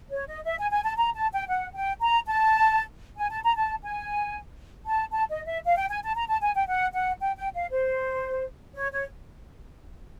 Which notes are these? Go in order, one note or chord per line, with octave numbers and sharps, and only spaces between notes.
C#5
D#5
E5
G#5
G#5
A5
A#5
A5
G5
F#5
G5
A#5
A5
G#5
A5
A#5
A5
G#5
A5
A5
D#5
E5
F5
G5
G#5
A5
A#5
A5
G#5
G5
F#5
F#5
G5
G5
F5
C5
C#5
C#5